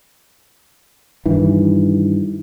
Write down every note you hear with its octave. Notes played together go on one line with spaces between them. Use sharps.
G2 D#3 E3